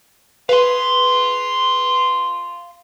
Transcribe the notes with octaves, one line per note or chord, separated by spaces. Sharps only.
G#4 B4 F5 C6